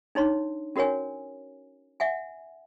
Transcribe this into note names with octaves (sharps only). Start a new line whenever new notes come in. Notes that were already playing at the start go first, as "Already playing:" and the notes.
D4 D#4 C#5 C6
C#4 F#4 A#4 C#5 G#5
E5 F#5 G#5